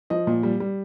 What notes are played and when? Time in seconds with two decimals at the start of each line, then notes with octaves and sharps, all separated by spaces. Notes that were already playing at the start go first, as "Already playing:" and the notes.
0.10 F3 D#5
0.27 A#2
0.43 G3
0.60 G3